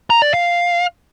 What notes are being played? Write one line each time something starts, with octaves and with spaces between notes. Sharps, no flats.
A#5
D5
F5